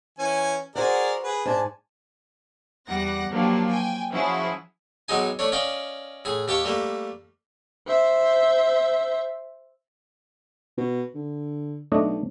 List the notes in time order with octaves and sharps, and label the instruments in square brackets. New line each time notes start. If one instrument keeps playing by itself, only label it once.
[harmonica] E3 C#4 G#5
[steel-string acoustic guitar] F#4 C5 F#5 [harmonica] G#4 A#4 D5
[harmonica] G#4 B4
[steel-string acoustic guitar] G#2 G#5 A5 [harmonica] D4
[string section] E2 G3 F#5 A#6
F3 F#3 A#3 D4 G4
G5 G#5
F3 C#4 E4 F#4 G#4
[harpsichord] B1 F#3 G#3 D#4 G#5
A3 D4 C#5
C#4 D5 D#5 F5 G5
A2 G#4
D#2 G4 A5 C#6
G3 A3 A#3
[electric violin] C5 E5
[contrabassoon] B2
D3
[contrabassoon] B1 [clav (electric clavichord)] A3 D4 D#5